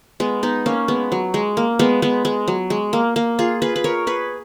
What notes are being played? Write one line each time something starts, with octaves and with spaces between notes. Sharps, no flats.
G#3 B3
B3 D#4
A#3 C#4
G#3 B3
F#3
G#3
A#3
G#3 B3
G#3 B3
G#3
F#3
G#3
A#3
A#3
F4 G#4
G#4 B4
B4
A#4 C#5
G#4 B4